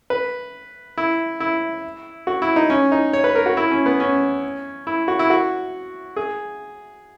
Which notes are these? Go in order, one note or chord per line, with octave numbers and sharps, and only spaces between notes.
B4
E4
E4
F#4
E4
D#4
C#4
D#4
C#5
B4
A#4
F#4
E4
C#4
B3
C#4
E4
F#4
E4
F#4
G#4